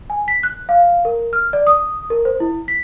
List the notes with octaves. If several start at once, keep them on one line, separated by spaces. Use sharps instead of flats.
G#5
B6
F#6
F5
A#4
F6
D5
D#6
A#4
C5
E4
B6